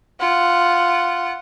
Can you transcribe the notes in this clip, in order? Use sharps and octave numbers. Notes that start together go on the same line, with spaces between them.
F4 F#5